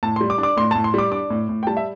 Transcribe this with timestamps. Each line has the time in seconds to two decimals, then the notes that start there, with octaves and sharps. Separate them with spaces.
0.03 A2 A5
0.16 G3 C6
0.30 D6
0.38 D4
0.43 D6
0.57 A2 C6
0.71 A2 A5
0.84 C6
0.94 G3 D6
1.12 D4 D6
1.30 A2
1.49 A2
1.63 G5
1.67 G3 A5
1.77 E5